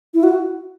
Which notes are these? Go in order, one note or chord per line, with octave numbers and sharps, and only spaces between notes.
E4
F#4